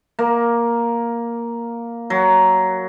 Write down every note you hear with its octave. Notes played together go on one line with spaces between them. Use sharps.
A#3
F#3